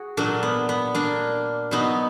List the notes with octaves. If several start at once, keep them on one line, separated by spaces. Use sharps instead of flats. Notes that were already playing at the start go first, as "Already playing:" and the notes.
Already playing: F#4 G#4
A#2 F#3 A#3 D4
B3
B3
A#3 D4
B2 F#3 B3 D#4